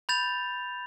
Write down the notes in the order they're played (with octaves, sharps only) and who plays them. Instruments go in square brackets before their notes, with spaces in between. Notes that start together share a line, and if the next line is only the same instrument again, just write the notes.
[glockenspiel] B5 G6 A6 F7